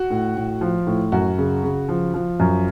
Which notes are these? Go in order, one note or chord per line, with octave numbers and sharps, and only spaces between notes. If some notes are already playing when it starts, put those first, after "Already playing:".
Already playing: F#4
A2
A2
F3
A2
F#2 F#4
C#3
C#3
F3
F3
F#2